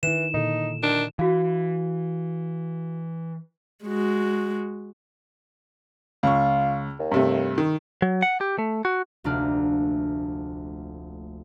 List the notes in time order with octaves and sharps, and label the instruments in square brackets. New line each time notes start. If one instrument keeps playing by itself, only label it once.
[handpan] D#3 E4 [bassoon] E3 [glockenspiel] E7
[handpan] A#2 D3 A4 [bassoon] D#4
[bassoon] D#3 [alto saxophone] D4
[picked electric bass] E3 [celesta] F#4 F5
[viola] G#3 F#4
[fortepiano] C#2 C#6 [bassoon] F4
[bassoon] D#2
[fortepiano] G2 C3 A3
D#3
[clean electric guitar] F#3
F#5
G4
A3
F#4
[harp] F1 D2 A#3 D4 F6